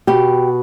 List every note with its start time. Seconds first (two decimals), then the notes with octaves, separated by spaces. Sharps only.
0.07 B2 G4